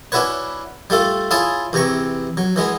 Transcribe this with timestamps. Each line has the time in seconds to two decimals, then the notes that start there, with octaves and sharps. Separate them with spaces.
0.12 C#4 D4 E4 F#4 B4 C#5
0.90 G3 A3 F4 A4
1.31 E4 F4 G#4 C#5 G#5 A5
1.73 E2 C3 E3 A#5 C#6
2.37 F#3
2.56 E3 G#3 B3